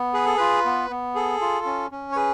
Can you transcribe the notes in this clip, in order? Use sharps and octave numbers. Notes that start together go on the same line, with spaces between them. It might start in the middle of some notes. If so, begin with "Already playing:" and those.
Already playing: B3
G#4 B4
A4
F4 B4
B3
B3
G#4 A4
F4
C#4
C#4
C#5
G#4 B4